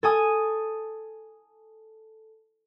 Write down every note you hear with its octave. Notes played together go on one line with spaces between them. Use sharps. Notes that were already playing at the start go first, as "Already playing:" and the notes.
A4 G#5 D#6